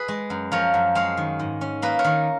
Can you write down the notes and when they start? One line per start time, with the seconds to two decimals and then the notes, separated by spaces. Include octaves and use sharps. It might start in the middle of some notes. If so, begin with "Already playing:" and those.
Already playing: G#4 B4
0.08 G#3
0.30 F#2
0.52 F3 A#4 C#5
0.74 F#2
0.95 G#3 C#5 F5
1.17 D#3
1.39 G#2
1.61 C#4
1.82 A#3 B4 D#5
1.99 A#4 C#5
2.04 D#3